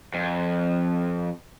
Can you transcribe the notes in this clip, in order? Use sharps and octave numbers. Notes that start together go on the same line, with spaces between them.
F2